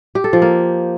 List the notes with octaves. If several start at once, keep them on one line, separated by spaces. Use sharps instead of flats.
G4
A4
F3
A#3